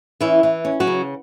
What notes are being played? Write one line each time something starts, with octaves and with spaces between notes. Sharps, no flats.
E3 C#4 E4
E3
C#4
F#3 F#4
C#3